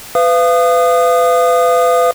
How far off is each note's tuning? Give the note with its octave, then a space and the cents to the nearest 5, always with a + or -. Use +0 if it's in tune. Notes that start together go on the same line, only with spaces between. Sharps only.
B4 +30 F5 -35 D#6 -25